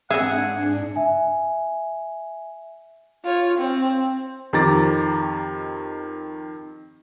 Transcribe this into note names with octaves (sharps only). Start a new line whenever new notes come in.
G#2 C4 D4 G#4 E5 F#5
E5 G#5
F4 C#5
C4
F2 D#3 G4 A#5 D6 A6